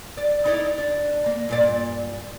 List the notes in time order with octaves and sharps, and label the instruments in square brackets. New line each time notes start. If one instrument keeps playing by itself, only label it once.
[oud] D5
D#4 E4 D5
D4
A#3
G2 A#2 D5